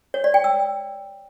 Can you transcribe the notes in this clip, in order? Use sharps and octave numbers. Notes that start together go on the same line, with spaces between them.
C#5
D5
G5
E6